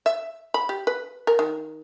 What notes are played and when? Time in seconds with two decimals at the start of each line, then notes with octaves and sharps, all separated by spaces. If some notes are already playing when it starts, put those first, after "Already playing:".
0.06 E5
0.54 B5
0.69 G4
0.87 B4
1.27 A#4
1.39 D#3